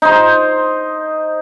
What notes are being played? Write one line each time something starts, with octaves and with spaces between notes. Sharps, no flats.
D#4 C5